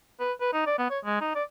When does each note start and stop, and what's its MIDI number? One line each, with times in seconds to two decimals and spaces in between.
0.20 0.32 71
0.41 0.48 71
0.53 0.62 63
0.67 0.76 74
0.79 0.86 59
0.90 0.99 73
1.05 1.20 56
1.21 1.33 63
1.35 1.43 74